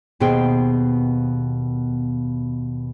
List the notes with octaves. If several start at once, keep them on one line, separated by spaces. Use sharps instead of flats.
D#2 B2 B3 G#4 C5 G5